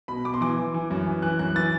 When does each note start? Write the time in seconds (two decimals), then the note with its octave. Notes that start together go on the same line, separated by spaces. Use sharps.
0.08 B2 B5
0.25 B2 D6
0.34 C6
0.41 E3 D6
0.58 E3
0.74 E3
0.90 F#2
1.06 E3
1.22 E3 F#6
1.39 F#2 F#6
1.56 E3 A6